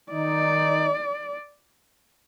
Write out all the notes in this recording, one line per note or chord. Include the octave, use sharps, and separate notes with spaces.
D#3 D#4 D5